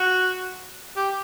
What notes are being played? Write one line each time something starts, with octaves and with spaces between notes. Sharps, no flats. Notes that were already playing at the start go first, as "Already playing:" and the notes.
Already playing: F#4
G4